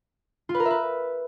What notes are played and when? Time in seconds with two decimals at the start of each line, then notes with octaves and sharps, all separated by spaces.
0.49 F4
0.54 B4
0.60 A#4
0.65 E5
0.70 B4